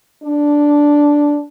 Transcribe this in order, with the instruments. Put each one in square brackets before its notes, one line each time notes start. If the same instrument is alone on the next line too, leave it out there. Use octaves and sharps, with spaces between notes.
[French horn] D4